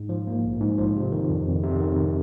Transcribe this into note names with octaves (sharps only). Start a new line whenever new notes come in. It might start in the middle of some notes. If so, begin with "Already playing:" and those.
Already playing: G#2
F3
A#3
A#1
G#2
F3
C3
D#3
F2
F2
C3
D#3